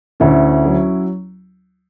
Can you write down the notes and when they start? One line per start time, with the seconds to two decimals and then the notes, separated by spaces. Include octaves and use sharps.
0.20 D2 C#4 E4
0.65 F#3